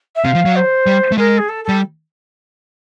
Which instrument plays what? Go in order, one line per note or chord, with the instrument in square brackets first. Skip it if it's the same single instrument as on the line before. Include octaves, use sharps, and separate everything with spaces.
[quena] E5
[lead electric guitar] C3 [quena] F5
[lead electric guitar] F3
F#3
[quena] C5
[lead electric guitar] G3
A3
[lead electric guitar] G#3 [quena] A#4
[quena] G#4
A4
[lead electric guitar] G3 [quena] A4